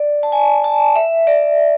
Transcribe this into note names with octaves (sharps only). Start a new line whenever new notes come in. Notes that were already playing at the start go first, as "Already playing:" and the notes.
Already playing: D5
A5
G#5
A5
E5
D5